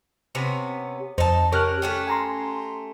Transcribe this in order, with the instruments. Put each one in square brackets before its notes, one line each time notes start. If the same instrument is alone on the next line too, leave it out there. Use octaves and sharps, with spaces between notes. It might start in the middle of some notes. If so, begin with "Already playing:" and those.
[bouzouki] C3 B3 C#4
[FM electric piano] F2 C5 [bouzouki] D#4 A5
[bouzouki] C#4 G4 A#4 [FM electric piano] C#6 F6 F#6
[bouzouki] A3 C#4 G4
[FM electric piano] G#5 A#5 C6